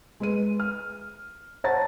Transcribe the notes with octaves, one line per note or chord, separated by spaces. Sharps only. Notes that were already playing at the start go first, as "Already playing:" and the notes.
G#3 B4 D#7
F6
C5 C#5 F#5 A5 A#5 A6